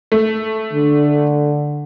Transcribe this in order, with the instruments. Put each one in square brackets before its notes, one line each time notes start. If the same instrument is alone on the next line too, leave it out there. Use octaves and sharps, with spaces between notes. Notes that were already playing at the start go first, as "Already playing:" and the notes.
[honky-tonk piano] A3
[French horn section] D3